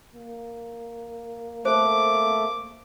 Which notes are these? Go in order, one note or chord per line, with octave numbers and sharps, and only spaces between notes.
A#3
A3 A4 C5 D6